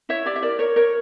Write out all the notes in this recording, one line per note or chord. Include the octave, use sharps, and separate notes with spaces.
E4 C#5 E5
G4 D5
E5
A#4 D5
A#4 C#5
A#4 C#5